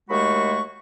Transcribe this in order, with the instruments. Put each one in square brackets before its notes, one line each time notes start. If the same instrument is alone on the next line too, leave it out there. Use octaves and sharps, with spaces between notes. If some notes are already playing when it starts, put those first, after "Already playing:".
[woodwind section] D#2 G#3 A3 F#4 B5 C#6